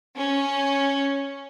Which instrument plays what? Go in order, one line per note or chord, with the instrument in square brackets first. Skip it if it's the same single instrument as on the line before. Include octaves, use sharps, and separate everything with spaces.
[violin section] C#4